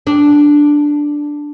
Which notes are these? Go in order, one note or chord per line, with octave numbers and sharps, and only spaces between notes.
D4